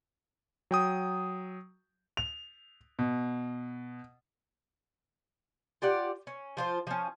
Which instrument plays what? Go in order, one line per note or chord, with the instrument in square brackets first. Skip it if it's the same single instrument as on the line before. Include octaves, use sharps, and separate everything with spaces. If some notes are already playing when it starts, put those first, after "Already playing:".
[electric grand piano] F#3 G5 D#6
[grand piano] F7
B2
[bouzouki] F4 G4 D5 F#5
C#4
F3 F4 C5
F3 C#4